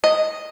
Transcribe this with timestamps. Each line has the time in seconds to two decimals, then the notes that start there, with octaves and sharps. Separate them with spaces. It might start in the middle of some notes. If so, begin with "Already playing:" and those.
0.04 D#5